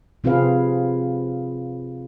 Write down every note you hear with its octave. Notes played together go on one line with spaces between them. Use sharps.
C3 C4 F4 G#4 B4 F5